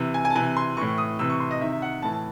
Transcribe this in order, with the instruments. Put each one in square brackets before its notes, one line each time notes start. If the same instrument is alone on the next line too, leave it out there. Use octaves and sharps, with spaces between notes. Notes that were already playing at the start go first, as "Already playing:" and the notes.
Already playing: [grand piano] C3 E3
G#5
G#5
A5
C3 E3 G#5
C6
A2 E3 C#6
D#6
C3 E3 E6
C#6
C6
D#5
D#3 E5
C3
E5
F#5
A2 E3 A5
A5